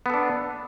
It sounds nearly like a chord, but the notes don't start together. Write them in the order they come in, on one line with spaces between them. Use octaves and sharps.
B3 A4 D4